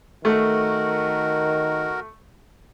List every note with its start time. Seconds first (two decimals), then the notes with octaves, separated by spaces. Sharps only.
0.25 D#3 A3 F#4 A#4